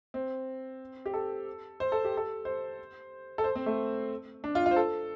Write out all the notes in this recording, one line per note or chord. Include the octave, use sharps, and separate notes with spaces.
C4
G4
A4
C5
A4
G4
A4
C5
A4
C5
C4
A3
D4
F4
F4
C5
A4